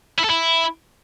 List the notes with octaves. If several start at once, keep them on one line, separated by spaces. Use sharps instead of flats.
E4
A4
E4